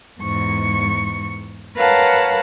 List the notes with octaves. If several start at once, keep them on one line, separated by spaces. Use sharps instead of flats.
E2 G#2 C#6
A#4 B4 C#5 F5 F#5 A5